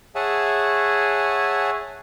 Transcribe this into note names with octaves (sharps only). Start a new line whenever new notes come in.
G#4 C#5 E5 F#5 G#5 A5